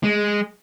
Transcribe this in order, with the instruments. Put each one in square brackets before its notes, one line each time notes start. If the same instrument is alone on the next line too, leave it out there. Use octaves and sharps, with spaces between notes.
[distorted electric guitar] G#3